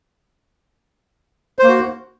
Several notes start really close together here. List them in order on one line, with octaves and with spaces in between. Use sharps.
C5 A#3 F#4